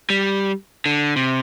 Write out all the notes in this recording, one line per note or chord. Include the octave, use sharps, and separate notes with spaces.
G3
D3
C3